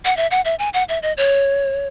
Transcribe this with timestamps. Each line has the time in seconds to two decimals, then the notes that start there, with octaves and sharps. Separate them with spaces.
0.05 F#5
0.17 E5
0.31 F#5
0.45 E5
0.59 G#5
0.74 F#5
0.89 E5
1.03 D#5
1.17 C#5